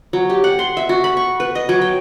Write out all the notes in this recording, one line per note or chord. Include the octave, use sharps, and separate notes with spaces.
F#3
G4
F#5
C6
E5
F#4
B5
C#6
B4
D#5
F#3
G5